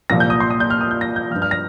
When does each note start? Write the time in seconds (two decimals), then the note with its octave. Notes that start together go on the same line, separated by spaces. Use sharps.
0.10 C2 A#2 F3 A#6
0.20 G6
0.30 D#6
0.40 C6
0.50 D#6
0.60 G6
0.70 F6
0.81 D#6
0.91 G6
1.01 A#6
1.16 G6
1.31 F3 F6
1.35 G2
1.42 F6
1.51 A#6